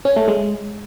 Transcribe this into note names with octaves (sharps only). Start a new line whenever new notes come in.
C#4
A3
G#3